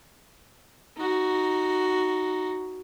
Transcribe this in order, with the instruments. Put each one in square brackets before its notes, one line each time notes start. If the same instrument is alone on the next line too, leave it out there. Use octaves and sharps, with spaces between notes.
[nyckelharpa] D#4 F#4